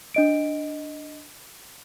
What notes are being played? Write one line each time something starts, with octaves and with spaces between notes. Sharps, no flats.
D4 D#5 D7